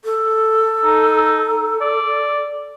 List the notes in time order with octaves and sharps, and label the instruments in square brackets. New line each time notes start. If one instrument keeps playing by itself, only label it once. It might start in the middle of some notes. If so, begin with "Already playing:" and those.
[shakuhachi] A4
[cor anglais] D#4
D5